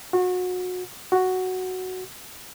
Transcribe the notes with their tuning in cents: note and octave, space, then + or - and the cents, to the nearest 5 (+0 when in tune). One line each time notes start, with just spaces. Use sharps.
F#4 -30
F#4 +0